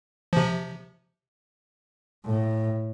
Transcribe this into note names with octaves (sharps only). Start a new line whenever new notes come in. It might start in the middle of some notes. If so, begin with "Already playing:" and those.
C3 F3
A2